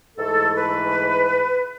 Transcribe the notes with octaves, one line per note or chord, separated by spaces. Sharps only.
G#2 E3 A3 A4
B4